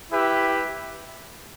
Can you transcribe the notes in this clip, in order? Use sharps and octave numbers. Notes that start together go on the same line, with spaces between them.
E4 G4 B4 E5